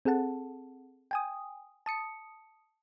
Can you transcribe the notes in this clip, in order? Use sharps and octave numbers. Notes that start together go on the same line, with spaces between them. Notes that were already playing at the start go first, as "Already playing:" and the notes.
C4 G#4 A4 F#5 A5
G5 G#5 D#6
A5 D#6 C#7